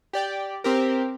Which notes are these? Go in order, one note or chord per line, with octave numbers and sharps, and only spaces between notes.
G4 D5 G5
C4 G4 A#4